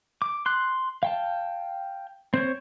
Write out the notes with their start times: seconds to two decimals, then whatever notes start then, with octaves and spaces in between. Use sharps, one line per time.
0.22 D6
0.46 C6 F#6
1.03 F5 G5 A5
2.34 C4 C5 C#5